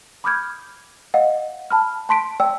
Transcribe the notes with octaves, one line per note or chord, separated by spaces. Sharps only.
B5 D6 D#6 F6 G6 G#6
D#5 F5 F#5
A5 B5 F6
A5 C6 B6 D7
D5 G5 E6